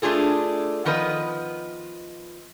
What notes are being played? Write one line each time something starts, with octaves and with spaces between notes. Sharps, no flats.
A3 D4 F4 G#4 A4
D#3 F3 B3 B4 D#5